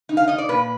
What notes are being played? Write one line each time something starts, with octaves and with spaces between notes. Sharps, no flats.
D#4
F5
D#4 D#5
D5
A#2 B4